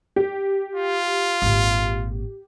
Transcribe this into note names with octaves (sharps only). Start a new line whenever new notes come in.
G4
F4
G#1 A#2